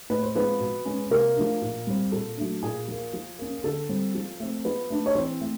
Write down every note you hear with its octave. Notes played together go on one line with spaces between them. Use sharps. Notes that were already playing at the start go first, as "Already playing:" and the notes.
A2 B4
C5
F3 G#3 B3 C4 B4
B2
G#3 C#4
C3 A#3 A#4
F3 A3 D4
A#2
G3 C4
A#2 A4
F#3 A3 D4
A#2 G#4
F3 A#3
F3
A#3 C#4
D3 A4
G3 C4
F3
A3 C4
F3 B3 B4
A3 D4
C#5
E3 C4 C5
A3